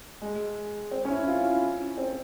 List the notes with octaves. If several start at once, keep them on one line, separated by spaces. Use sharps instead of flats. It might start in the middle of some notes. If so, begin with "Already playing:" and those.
G#3
C4
C#4
E4
F4
E4
C4